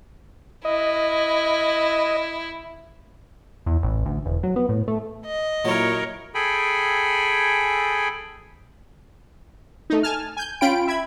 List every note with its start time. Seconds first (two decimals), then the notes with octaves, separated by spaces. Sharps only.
0.65 E4 D#5
3.66 E2
3.83 A1
4.05 D2
4.26 E1
4.43 F#3
4.56 B3
4.69 A2
4.88 A3
5.26 D#5
5.65 A#2 F#3 E4 A#4 C#5
6.35 G#4 A4 G5 G#5 B5
9.90 A3 D#4
10.03 G#5 A5 F6
10.37 G#5 G6
10.61 C#4 F4 G5 B5 D7
10.87 E5 B5 G#6